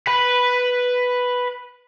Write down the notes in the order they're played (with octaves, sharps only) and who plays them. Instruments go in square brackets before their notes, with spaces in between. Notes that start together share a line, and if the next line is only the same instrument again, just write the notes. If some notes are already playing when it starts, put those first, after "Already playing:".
[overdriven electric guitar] B4 B5